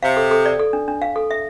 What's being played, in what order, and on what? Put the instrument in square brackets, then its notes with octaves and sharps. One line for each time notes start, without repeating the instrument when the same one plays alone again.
[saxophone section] C3 [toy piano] F5
[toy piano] A4
A4
D5
A4
D4
D4
F5
A4
E5